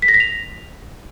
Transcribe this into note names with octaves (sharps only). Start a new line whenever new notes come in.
B6
A#6
B6
F7